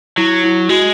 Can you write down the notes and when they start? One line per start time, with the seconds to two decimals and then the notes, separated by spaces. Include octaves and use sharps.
0.17 F#3 E4
0.44 E4
0.69 G#3 F#4